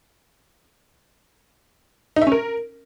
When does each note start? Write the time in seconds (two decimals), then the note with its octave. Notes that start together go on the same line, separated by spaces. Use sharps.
2.16 D#4
2.22 E5
2.27 C#4
2.32 A#4